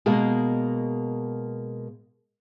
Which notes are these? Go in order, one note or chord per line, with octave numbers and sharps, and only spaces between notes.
B2 G#3 A#3 A#4